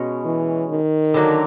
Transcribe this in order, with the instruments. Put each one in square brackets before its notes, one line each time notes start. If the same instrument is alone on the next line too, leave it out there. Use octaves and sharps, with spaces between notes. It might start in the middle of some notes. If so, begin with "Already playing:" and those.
Already playing: [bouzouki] B2 G#3 C#4
[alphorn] E3
D#3
[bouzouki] D3 F#3 A#3